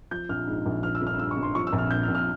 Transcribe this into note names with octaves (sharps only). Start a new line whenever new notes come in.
F3 G6
A#1 F6
G#2
A#1
F3 F6
E6
G1
F6
G2 E6
C#6
G1
C6
F3 C#6
E6
A#1
F6
A#2 G6
F6
A#1
F6